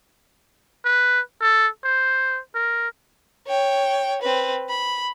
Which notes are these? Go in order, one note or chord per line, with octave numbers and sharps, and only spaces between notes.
B4
A4
C5
A#4
C#5 G5
C4 B4
B5